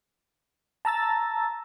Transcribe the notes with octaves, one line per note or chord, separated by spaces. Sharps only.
A5 A#5 E6 A6